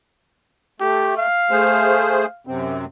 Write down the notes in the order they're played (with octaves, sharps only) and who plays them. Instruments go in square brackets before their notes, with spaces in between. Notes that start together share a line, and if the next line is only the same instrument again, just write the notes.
[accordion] A3 [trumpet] G4
[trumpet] F5
[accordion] A3 G#4 C5
F#2 C3 C4